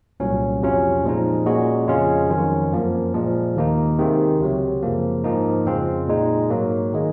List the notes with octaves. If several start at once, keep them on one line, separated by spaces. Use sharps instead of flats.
C2 A#2 F#3 C#4
F2 C3 F#3 C#4 F4
A#2 F3 G#3 D#4
A#2 G#3 C#4 F#4
F2 C#3 G#3 C#4 F4
F2 D#3 F#3 C#4
F#2 F3 A#3
A#2 F3 G#3
D#2 D#3 A#3 D#4
C3 D#3 G#3 C4
C#2 C3 F#3
F#2 C#3 F3 A#3
G#2 F3 A#3 D#4
F2 C#3 G#3 C4 F4
A#2 G#3 D#4
G#2 F#3 A#3
D#3 G#3